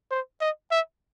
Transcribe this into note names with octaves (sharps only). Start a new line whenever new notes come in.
C5
D#5
E5